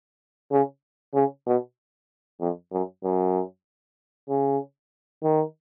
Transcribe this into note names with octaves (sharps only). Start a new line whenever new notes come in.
C#3
C#3
B2
F2
F#2
F#2
C#3
D#3